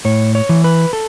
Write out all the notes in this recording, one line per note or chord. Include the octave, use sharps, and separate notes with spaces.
A2 C#5
C#5
E3
B4
A4